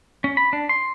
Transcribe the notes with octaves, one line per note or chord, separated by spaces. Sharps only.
C#4
B5
D4
C6